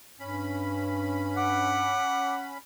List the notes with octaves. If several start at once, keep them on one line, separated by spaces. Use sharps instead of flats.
G2 C#4 B5
F#5 D6